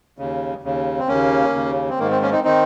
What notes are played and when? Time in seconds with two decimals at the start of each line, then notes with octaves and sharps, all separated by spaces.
0.18 D#2 C#3
0.63 D#2 C#3
0.98 C4
1.08 D#2 C#3 A#3 C#4
1.54 D#2 C#3
1.89 C4
1.99 G#2 D#3 A#3
2.11 C4
2.22 A#3 C#4
2.32 C4 D#4
2.44 D#3 C4 D#4